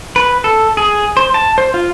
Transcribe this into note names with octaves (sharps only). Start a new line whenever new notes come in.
B4
A4
G#4
C5
A5
C5
F4